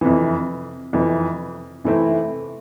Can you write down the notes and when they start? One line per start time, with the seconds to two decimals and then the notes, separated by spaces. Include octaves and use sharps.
0.01 F2 C3 E3
0.93 F2 C3 E3
1.84 C3 E3 A3 C4 E4